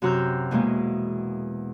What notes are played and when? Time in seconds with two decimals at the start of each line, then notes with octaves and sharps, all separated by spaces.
0.02 F#2 C3 F#4 A#5 E6 G6
0.51 E2 B2 G#3 A#3